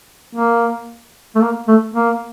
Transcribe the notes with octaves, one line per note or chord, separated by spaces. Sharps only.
A#3
A3
A#3
A3
A#3